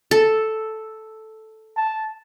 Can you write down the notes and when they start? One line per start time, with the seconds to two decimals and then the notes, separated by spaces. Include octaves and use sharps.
0.11 A4
1.77 A5